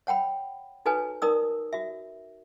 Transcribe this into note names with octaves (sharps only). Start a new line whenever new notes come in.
C#5 F#5 G5 B5
D#4 F#4 A4 B4 C#5 G#5
D#4 A#4 D5 D#6 E6
F#4 E5